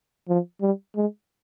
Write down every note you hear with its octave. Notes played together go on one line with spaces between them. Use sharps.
F3
G3
G#3